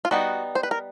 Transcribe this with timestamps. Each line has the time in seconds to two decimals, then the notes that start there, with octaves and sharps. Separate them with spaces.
0.05 F4
0.11 G3 B3 D#4 F#4
0.55 C5
0.63 B4
0.71 A#4